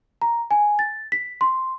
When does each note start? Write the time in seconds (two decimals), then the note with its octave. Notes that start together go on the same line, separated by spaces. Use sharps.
0.22 A#5
0.51 G#5
0.79 A6
1.12 B6
1.41 C6